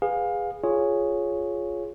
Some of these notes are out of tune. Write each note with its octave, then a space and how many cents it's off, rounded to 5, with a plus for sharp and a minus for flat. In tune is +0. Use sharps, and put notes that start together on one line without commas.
G#4 -20 B4 +0 F5 +25
F4 +0 G#4 +0 C#5 +0